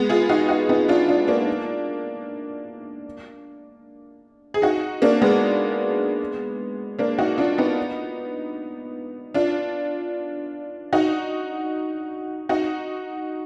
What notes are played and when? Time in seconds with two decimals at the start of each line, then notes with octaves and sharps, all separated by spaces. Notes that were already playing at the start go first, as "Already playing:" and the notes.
Already playing: G#3 B3
0.09 F4 G#4
0.29 D#4 F#4
0.49 D#4 F#4
0.69 B3 D#4
0.89 D4 F4
1.08 D4 F4
1.28 A#3 D4
4.54 G#4
4.62 D#4 F#4
5.02 A#3 D4
5.22 G#3 B3
6.99 A#3 D4
7.19 D#4 F#4
7.38 D4 F4
7.58 B3 D#4
9.34 D4 F4
10.93 D#4 F#4
12.49 D#4 F#4